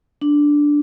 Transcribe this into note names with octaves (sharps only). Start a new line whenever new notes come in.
D4